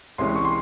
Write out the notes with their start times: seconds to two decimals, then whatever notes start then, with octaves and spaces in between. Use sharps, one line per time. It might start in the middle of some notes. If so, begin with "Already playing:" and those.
0.18 C2 C3 E3 G#3 C#4 C6
0.35 C#6
0.45 C6